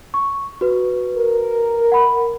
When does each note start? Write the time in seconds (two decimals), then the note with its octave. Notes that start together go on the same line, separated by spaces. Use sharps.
0.14 C#6
0.61 F#4 B4
1.17 A#4
1.92 F#5 B5